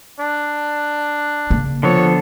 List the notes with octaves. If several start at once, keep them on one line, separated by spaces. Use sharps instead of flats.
D4
C#3 A#3
D3 F3 B3 A4 C#5